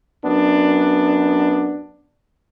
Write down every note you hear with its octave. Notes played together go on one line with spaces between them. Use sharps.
F#2 B3 D4